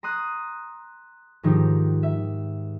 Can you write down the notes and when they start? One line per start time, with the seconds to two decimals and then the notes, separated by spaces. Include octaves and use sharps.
0.03 A#5 C6 D#6 F#6
1.43 G#2 D#3 F3 D#4 G4
2.03 E5